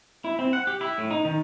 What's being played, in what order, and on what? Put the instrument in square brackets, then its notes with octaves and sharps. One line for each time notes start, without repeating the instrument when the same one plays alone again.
[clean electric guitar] E4
C4
F#5
G4
E4
A2
D#4
D#3